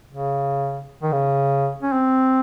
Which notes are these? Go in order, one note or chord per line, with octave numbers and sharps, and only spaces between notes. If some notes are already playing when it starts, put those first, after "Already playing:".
C#3
D#3
C#3
C#4
C4